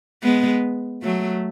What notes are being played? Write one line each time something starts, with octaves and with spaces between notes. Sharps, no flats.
G#3 B3
F#3 A3